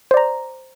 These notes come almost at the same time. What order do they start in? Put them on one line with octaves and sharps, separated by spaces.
C5 D5 A#5